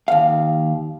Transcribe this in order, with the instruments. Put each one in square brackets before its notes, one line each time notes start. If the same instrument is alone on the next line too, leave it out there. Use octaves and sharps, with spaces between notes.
[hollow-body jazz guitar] D#2 F5